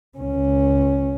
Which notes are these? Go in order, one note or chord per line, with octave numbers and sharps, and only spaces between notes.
C#2 C#4